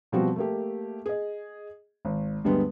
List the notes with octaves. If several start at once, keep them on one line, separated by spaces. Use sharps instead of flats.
B2 F3 G3 C4 F#4
A3 A#3 G4
G#4 D#5
G#1
D2 G2 G3 G#3 B3